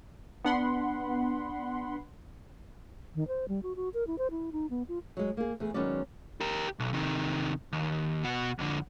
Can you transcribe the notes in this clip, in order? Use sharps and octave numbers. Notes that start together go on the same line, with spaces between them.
B3 D4 F#5 B5 C6
D#3
C5
G3
F#4
F#4
A#4
E4
C5
E4
D#4
B3
F4
F#3 G#3
A#3 G#4
E2 A3 G#4
D#3 F#3 G#3 B3 C#4 D5
G4 A#4
B1
C3 D#3
D#2
B2 F#4
F2 D3